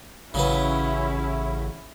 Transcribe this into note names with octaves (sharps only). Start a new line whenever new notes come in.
A1 C#3 F#3 C#4 E4 B4